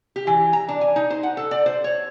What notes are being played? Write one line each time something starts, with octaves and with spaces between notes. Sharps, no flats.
G4
E3
A#5
D4
G#5
D#4
C5
F#5
A4
D5
C5
C#5